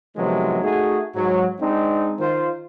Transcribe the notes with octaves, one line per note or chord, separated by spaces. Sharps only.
C3 D#3 F3 F#3 G#3 B3
A3 D#4 F#4 G#4
G#2 F#3
G#3 C4 D4 D#4
D#3 F4 C5